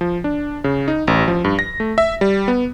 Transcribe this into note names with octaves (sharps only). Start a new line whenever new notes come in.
F3
D4
C#3
D#4
A1
F3
G2
A#6
A3
E5
G3
B3